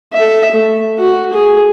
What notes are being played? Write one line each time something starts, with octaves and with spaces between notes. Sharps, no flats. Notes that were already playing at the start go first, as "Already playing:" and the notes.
A4 E5
A3
F#4
G#4